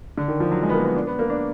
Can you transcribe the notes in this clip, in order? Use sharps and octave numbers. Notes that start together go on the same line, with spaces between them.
D3
D#3
F3
F#3
G#3
B3
A#3
B3
D4
B3
A#3
D4